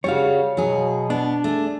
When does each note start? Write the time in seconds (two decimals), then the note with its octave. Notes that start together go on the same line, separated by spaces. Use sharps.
0.04 C#3 G3 C#4 F#4 C#5 F5
0.57 B2 F#3 G#4
1.10 B3 D4
1.44 A3 G#4